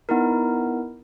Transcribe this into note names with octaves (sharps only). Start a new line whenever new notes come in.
B3 D#4 E4 A#4